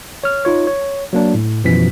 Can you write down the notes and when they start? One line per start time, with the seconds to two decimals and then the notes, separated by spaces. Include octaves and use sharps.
0.24 C#5 F6
0.45 D#4 F4 C#5
0.67 C#5
1.13 F#3 A#3 D4
1.34 A2
1.64 F#2 B2 E3 F3 B6